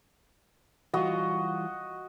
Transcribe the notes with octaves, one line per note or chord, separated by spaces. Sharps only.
E3 G3 F4 F#4 D#5